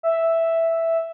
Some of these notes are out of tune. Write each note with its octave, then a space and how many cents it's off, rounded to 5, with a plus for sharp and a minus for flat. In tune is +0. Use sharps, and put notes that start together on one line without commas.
E5 +0